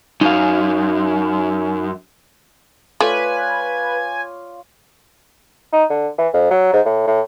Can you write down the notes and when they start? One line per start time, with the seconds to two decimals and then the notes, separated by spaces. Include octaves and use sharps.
0.21 F#2 D#4 F5
3.00 A3 F4 B4 C#5 D5 G#5
5.73 D#4
5.90 D3
6.18 E3
6.33 F2
6.50 F#3
6.73 G#2
6.85 A2
7.07 A2